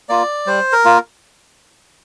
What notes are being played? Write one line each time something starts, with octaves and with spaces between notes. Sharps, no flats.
A#3 F4 D5
G3 C5
A#4
A#3 F4